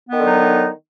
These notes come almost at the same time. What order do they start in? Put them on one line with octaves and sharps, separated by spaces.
B3 D#3 D3 F#3 D#4